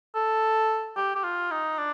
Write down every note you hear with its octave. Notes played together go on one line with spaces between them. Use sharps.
A4
G4
G4
F4
D#4
D4